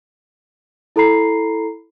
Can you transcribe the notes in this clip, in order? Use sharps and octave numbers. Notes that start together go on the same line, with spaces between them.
E4 A4 A#5 B5 C7